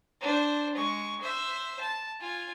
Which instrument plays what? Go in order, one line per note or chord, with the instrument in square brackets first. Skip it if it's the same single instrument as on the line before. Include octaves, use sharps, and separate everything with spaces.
[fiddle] D4 C5
G#3 C#6
C5 E5
A5
F4 G#5